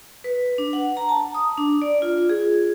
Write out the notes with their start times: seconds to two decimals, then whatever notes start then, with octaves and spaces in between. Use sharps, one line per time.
0.24 B4
0.58 D4
0.73 F#5
0.97 A#5
1.09 A5
1.34 D#6
1.58 D4
1.82 D5
2.02 F4
2.30 G#4